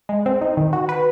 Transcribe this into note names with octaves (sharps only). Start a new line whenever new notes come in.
G#3
C4
D#4
D#3
F#4
B4